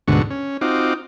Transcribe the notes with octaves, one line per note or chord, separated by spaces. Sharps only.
D2 G#2 B2 D3 F#4 C#6
C#4
C4 D#4 F4 F#4 D6